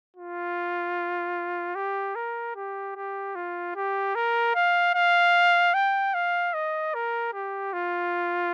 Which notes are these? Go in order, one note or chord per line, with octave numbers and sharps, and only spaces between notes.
F4
G4
A#4
G4
G4
F4
G4
A#4
F5
F5
G5
F5
D#5
A#4
G4
F4